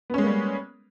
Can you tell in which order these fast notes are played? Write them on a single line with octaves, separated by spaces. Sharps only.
B3 C#4 G#3 A#3 G3